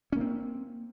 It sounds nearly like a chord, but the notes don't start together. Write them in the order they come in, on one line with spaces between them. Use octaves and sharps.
C#4 A#3 C4